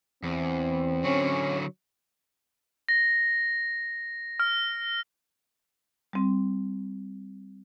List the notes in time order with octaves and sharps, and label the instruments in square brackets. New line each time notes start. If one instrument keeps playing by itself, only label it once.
[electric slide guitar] E2 [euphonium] C4
[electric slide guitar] D3 F#3 [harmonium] C#4
[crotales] A#6
F6
[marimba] G3 C4